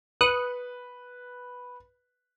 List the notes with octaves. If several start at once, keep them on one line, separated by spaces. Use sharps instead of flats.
B4 D#6 F#6 C#7